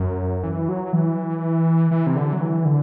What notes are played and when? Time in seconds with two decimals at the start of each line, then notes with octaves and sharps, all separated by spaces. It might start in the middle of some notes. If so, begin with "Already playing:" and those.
Already playing: F#2
0.44 E3
0.69 F#3
0.93 E3
1.91 E3
2.07 C3
2.16 D3
2.33 F#3
2.41 E3
2.65 D3